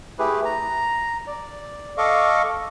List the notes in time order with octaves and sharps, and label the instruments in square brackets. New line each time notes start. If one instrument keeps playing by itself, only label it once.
[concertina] A3 E4 G4 G#4 B4
A#5
D5
A4 D#5 F5 C#6 D6